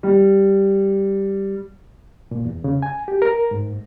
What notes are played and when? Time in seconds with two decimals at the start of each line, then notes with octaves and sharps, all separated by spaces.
0.03 G3
2.31 A#2
2.45 E2
2.64 C#3
2.82 G#5
3.08 G4
3.22 A#4
3.51 G#2